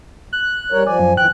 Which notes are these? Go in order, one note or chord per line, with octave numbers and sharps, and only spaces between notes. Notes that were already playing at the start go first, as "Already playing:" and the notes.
F#6
G3 A#4 C#5
F3 D5 G#5
F#2
E3 G5 F#6